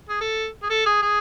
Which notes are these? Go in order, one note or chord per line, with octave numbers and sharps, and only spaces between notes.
G#4
A4
G#4
A4
G#4
G#4